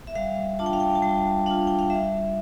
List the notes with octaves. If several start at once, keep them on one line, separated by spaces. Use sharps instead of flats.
E5
G3 F5
D4 F4 A5
G5
F5
G5
A5
G3 G5
D4 F4 F5
G5
F5
G3 E5